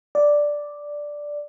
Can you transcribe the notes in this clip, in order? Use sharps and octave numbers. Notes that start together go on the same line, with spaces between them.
D5